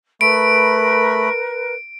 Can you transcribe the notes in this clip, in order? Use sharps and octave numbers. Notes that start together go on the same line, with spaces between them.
A3 A#4 B4 B5 D7